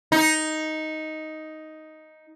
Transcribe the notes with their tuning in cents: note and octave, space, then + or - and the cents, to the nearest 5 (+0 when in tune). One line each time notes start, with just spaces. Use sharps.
D#4 +5